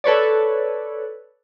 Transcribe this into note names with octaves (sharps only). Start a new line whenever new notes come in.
A4 B4 C#5 D5